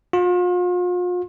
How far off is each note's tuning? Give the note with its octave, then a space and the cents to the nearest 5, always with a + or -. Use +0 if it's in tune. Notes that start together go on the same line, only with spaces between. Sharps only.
F4 +40